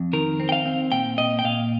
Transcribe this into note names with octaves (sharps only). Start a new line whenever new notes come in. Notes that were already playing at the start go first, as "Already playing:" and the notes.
Already playing: F2
D#3 A#4
C4
G5
F5
C4
A#2 G5
A#2 D#5
G5
A#2 F5